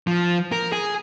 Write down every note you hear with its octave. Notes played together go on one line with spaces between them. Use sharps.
F3
A#4
G#4